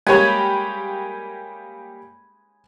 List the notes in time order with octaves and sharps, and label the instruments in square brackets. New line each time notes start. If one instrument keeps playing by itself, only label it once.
[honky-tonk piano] G3 A#3 G4 [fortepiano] G#3 C#5 [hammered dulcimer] G#5 B5